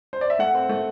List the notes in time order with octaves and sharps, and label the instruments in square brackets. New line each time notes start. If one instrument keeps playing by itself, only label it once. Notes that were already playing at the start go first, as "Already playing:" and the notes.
[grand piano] C5
D5
E5
[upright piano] A3 [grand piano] F#5
[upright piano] C4
A3